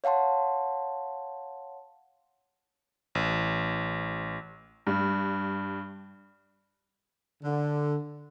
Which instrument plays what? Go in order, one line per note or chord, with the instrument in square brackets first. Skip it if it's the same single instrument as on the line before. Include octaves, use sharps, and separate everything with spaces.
[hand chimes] C#5 F5 F#5 A5 C6
[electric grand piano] A1
[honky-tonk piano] G2
[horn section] D3